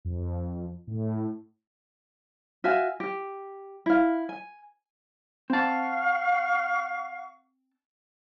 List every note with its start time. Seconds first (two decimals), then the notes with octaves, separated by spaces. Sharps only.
0.05 F2
0.87 A2
2.64 F#4 E5 F5 G#5
3.00 G4
3.86 E4 F5
4.29 G#5
5.50 C4 F5 F#5 A5 C#6